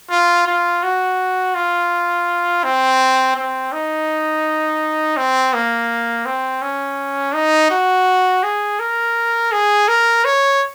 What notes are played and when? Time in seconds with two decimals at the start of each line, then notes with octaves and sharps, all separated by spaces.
0.10 F4
0.47 F4
0.83 F#4
1.55 F4
2.64 C4
3.36 C4
3.72 D#4
5.17 C4
5.53 A#3
6.26 C4
6.62 C#4
7.34 D#4
7.71 F#4
8.43 G#4
8.80 A#4
9.52 G#4
9.88 A#4
10.25 C#5